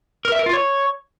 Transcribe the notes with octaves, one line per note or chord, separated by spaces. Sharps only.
A#4
E5
A#4
F4
C#5